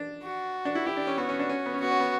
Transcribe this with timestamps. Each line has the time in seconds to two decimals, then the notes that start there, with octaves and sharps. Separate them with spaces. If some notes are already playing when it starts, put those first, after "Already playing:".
Already playing: D4
0.23 F#4
0.65 D4
0.75 E4
0.86 E4 G4
0.97 D4
1.07 C#4
1.18 B3 F#4
1.29 C#4
1.39 D4
1.49 C#4
1.66 B3
1.74 C#4
1.80 B3 F#4
1.91 C#4
2.00 B3